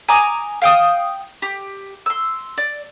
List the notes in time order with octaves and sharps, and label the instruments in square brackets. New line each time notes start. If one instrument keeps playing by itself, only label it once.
[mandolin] G#5 A#5 D6 D#6
F5 G5 D#6
G4
C6 E6
D5